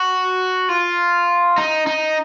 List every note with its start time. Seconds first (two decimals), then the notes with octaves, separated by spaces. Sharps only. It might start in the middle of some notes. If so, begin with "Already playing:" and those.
Already playing: F#4
0.69 F4
1.58 D#4
1.87 D#4